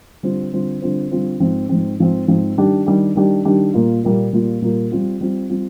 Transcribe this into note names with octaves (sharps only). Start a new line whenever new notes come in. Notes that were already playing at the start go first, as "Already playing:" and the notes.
D3 G3 C4 F4 C5
D3 G3 C4 F4 C5
D3 G3 C4 F4 C5
D3 G3 C4 F4 C5
G#2 F3 C4
G#2 F3 C4
G#2 F3 C4
G#2 F3 C4
D#3 G3 D4 G4
D#3 G3 D4 G4
D#3 G3 D4 G4
D#3 G3 D4 G4
A#2 G3 A#3 F4
A#2 G3 A#3 F4
A#2 G3 A#3 F4
A#2 G3 A#3 F4
G3 C4 F4
G3 C4 F4
G3 C4 F4